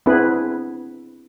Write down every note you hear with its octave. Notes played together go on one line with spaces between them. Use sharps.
B3 C4 D4 E4 G#4 B4